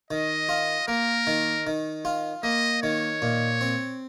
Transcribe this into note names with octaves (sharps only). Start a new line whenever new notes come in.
D#3 D#5
F4
A#3 A#4
D#3
D#3
F4
A#3 D#5
D#3 C#5
A#2
C4